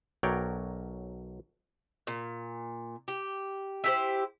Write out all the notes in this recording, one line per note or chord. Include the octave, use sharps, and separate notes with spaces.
B1 F#3 A#4 C#5 D5 G5
A#2
G4
E4 G4 C5